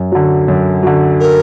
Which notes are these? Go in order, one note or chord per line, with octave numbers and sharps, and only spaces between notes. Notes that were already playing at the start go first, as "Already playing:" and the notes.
Already playing: F#2
D3 F#3
F#2
D3 F#3
A#4